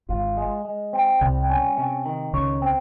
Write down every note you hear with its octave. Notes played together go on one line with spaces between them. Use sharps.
G#1 G#2 F4
G#3
G#3
C4
C2 C3 G3
C#4
C3
D#3
C#2 C#3 C#5
C4